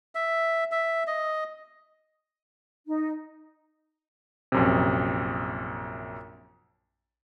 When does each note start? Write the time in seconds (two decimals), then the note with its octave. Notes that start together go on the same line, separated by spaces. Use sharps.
0.15 E5
0.72 E5
1.07 D#5
2.87 D#4
4.52 A#1 F#2 C3